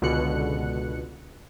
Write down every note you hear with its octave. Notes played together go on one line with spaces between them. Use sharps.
C#2 B2 D3 F#6 C#7